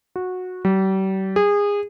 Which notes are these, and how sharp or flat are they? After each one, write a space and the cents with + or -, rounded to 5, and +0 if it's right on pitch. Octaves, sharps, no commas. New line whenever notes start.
F#4 -15
G3 -40
G#4 -25